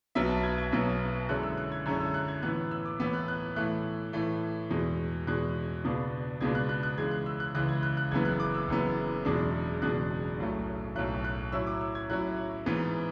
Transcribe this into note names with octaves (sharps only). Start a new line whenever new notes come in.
B1 B2 F#3 B3 E5
A5
G#6
G#6
B1 B2 F#3 B3
F#2 D3 G#3 C#4 E4 F#6
E6
F#6
G#6
F#2 D3 G#3 C#4 E4 E6
E6
F#6
G#6
A2 E3 B3 F#6
E6
D6
A2 E3 B3 E6
F#6
F#6
A2 E3 A3 F#6
A2 E3 A3
E2 B2 G#3
E2 B2 G#3 F#6
C#2 B2 G#3 B3 D4
C#2 B2 G#3 B3 D4 G#6
F#6
F#6
F#6
C#2 C#3 E3 G#3 G#6
F#6
E6
F#6
C#2 C#3 E3 G#3 F#6
G#6
F#6
F#6
F#1 F#2 E3 B3 G#6
F#6
D6
E6
F#1 F#2 E3 B3
F#1 E2 B2 G#3 D4
F#1 E2 B2 G#3 D4 F#6
B1 A2 F#3 A3
B1 A2 F#3 A3 F#6
F#6
A2 F#3 C#4 E4 E6
D6
E6
G#6
A2 F#3 C#4 E4 F#6
G#2 E3 B3